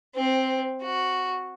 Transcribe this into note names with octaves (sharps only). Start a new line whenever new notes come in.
C4
F#4